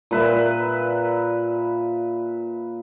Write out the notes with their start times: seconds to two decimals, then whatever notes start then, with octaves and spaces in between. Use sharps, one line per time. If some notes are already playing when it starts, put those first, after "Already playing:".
0.11 A#2 B4 E5